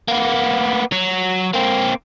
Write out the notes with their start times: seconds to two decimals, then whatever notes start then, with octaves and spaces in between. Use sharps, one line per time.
0.08 A#3 B3
0.92 F#3
1.54 A#3 C4